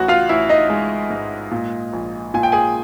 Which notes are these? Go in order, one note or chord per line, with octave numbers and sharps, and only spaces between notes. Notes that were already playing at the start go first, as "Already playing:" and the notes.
Already playing: A1 F#4 F#5
F4 F5
A1 E4 E5
D#4 D#5
G#3
G#2
A#2
A#1
A#2 G#5
G5
G#4 G#5